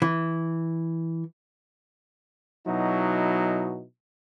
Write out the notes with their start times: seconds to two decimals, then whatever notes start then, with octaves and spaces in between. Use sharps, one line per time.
0.02 E3
2.67 B2 F#3 D#4 E4